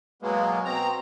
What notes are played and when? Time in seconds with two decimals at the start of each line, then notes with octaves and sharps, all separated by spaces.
0.22 B2 F#3 G#3 A#3 B3
0.65 B2 C4 A#5